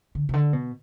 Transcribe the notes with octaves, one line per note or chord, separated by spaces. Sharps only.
D3
C3
D3
B2